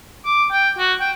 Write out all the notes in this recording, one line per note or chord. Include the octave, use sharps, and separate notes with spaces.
D6
G5
F#4
G5